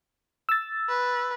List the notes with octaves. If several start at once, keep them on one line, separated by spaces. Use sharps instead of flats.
E6 A6
B4